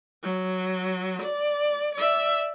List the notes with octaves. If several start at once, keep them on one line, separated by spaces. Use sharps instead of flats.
F#3
D5
D5 E5